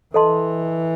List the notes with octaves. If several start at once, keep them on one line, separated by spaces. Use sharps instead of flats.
E3 A4 D#5 A5 C6